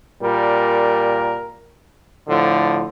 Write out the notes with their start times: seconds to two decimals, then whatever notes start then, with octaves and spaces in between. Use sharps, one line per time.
0.21 A#2 G3 A#4
2.27 A2 D3 F3